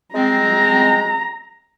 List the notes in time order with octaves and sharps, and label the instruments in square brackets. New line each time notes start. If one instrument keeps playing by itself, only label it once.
[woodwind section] G#3 C4 [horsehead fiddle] A#5